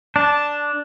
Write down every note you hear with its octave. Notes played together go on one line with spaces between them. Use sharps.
D4 A5